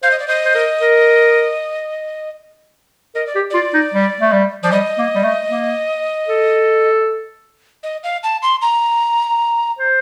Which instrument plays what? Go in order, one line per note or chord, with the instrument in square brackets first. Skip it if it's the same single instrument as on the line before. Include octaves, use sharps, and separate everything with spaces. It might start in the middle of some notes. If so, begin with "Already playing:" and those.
[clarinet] C5 [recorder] F5
[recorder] D#5
D5
[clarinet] C5 [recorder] D#5
[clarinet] C5
A#4
A#4
[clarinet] A#4 [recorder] D#5
[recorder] D5
[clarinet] G4
[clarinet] F4 [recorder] D5
[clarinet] D#4
G3
A3
G3
[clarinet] F3 [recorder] D5
[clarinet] G3 [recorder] D#5
[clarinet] A#3
G3
A3
A#3
A4
[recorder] D#5
F5
A5
C6
A#5
[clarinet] C5